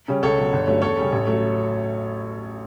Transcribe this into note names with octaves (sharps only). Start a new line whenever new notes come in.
C#3 G3 C#4
C#2 A4 C#5
B2 F#3
G1
G2 F#3 A3 C#4
E2 A4 C#5
C#3 G3 C#4
A1
F#3 A3